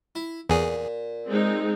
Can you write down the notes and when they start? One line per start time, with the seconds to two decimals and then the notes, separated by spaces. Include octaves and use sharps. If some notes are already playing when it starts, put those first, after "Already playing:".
0.15 E4
0.50 E2 A#2 G#4
1.27 G#3 C4 D#4